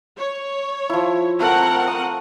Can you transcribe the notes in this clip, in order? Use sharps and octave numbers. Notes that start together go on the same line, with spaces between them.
C#5
F3 E4
A3 C4 A#4 F#5
D#6